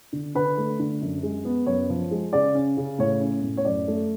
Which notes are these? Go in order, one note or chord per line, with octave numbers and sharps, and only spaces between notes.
D3
D3 B4
A3
D3
F#2
G#3
B3
F#2 C#5
F3
G#3
C#3 D5
C#4
C#3
A2 C#5
C#4
A2
C#5
F#2 D5
A3